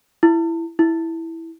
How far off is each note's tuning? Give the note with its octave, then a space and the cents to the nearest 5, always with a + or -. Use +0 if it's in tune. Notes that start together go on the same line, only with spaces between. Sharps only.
E4 +10
E4 -5